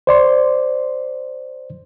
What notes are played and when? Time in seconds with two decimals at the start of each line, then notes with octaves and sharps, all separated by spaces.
0.07 C5 D5 C6